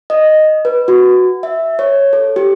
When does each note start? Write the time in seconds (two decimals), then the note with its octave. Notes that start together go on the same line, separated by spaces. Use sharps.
0.10 D#5
0.65 B4
0.88 F#4
1.43 E5
1.79 C#5
2.13 A4
2.36 G4